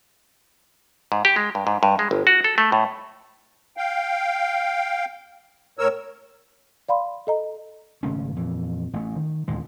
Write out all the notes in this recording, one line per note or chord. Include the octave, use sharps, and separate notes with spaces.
G#2
G4
G#3
G2
G#2
G2
G#3
G1
F#4
A4
A3
A2
F5 G5
A2 A#4 C#5 E6
D5 F5 B5 C6
A4 D#5 A#5
G#1 C#3 A3 C#4
F2 A#2 E3
A1 A3
D#3
A1 D#2 A#2 G#3